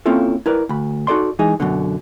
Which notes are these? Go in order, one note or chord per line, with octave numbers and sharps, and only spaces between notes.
A#3 C4 C#4 E4 F4 A4
E4 A#4 B4 D5
D2 B5
D#4 F#4 A4 D5 C6
E3 G#3 D#4 G#4
F#2 B2 D3